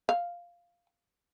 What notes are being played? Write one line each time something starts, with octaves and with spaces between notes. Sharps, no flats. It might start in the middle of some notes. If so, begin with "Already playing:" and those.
F5